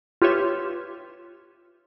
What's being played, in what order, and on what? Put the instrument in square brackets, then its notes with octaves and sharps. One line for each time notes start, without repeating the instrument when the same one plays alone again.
[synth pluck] F4 G4 B4 C#5 E5